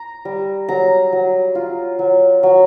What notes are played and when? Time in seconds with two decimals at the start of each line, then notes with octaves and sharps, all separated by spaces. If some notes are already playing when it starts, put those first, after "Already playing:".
Already playing: A#5
0.25 G3
0.69 F#3 A#5
1.13 F#3
1.55 F4
1.99 F#3
2.43 F#3